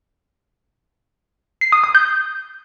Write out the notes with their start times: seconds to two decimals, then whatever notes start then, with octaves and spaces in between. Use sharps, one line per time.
1.61 C7
1.72 D#6
1.84 D#6
1.95 G6